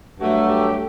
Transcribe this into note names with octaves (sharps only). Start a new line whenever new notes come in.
G2 F#3 A3 F#4
G4